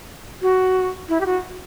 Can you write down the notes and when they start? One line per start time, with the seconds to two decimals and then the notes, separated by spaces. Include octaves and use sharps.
0.42 F#4
1.09 E4
1.21 G4
1.26 F#4